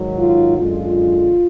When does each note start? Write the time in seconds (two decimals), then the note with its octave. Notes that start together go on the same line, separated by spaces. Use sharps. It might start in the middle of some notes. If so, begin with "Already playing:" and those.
Already playing: G#2 D#3 F#3
0.19 F4
0.58 F#2 D3 G#3 F4